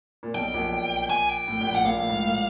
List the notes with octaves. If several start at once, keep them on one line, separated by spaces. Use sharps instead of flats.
A#2
B1 B2 G5
A#1 A#2
G#5
G5
A2
A#1 A#2
A2 F#5
A#1 A#2 F5
A2
G#2
A2